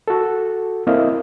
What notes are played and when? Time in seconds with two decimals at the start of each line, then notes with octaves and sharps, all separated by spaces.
0.08 F#4 A4
0.87 A#3 C4 E4 D#5 F5